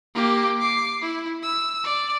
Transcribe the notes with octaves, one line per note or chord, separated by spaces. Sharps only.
A#3 G4
D6 C7
E4
E6
D5